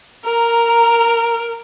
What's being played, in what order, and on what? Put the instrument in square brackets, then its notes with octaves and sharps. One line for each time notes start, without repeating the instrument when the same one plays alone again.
[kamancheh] A#4 A#5